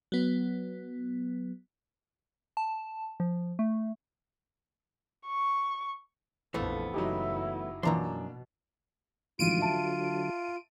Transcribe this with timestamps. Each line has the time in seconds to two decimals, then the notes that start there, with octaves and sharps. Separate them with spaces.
0.12 F#3 B3
2.57 A5
3.20 F3
3.59 A3
5.27 C#6
6.54 A#1 F2 E3 A3 B3
6.94 F#1 F#3 D#4 E4 G4
7.83 F#2 B2 E3 F3 A#3 D4 A#5 C6
9.39 A1 G#2 D3 F3 F#3 F4 D7 D#7
9.60 E5 A5